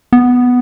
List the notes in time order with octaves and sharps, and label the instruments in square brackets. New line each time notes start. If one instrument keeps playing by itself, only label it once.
[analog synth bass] B3